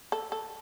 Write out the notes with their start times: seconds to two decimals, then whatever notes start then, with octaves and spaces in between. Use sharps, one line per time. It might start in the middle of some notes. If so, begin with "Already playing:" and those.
0.12 A4
0.32 A4